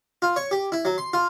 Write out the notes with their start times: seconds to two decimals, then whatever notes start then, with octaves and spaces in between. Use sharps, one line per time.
0.22 F4
0.36 C#5
0.51 G4
0.72 E4
0.85 F#3
0.98 C6
1.13 F4